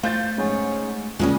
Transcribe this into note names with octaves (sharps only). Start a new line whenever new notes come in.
A3 C5 F5 G6 A6
G#2 C#4 G#4 C#5
D#2 A#2 C#3 G3 G#3 C#4 D#5